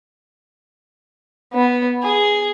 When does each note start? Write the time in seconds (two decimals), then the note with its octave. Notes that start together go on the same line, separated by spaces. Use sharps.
1.53 B3
2.03 G#4